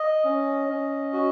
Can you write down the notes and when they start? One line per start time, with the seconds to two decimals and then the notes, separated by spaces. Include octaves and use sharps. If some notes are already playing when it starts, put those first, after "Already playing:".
Already playing: D#5
0.25 C#4
0.69 C#4
1.13 F#4